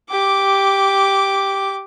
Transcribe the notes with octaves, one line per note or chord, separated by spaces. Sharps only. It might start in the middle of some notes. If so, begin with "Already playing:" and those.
G4 D6